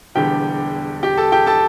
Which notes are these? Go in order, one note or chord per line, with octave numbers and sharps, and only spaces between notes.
E1 E2 D3 G3 G4 G5
G4 G5
A4 A5
G4 G5
A4 A5